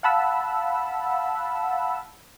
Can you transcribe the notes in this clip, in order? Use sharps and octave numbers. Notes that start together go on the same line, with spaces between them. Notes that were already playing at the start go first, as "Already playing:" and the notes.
F5 F#5 A5 B5 E6